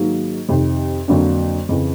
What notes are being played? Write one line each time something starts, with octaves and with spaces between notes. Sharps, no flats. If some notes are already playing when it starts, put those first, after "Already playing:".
Already playing: G#2 D#3 F#3 A#3
F2 C3 D#3
F2 D3 F#3 A#3 D4
F2 C#3 E3